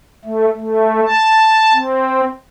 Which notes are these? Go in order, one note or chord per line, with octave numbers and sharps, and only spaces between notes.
A3
A3
A5
C4